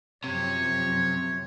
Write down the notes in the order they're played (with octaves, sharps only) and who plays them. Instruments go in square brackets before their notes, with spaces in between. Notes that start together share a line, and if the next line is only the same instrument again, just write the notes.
[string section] F#2 F3 [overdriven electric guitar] C3 [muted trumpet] C#5